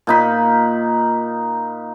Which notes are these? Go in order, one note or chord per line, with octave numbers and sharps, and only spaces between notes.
A#2 D#4 B5